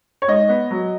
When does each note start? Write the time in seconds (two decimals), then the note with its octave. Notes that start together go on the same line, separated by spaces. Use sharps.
0.22 C#5
0.28 G#2 D#5
0.49 B3
0.71 F#3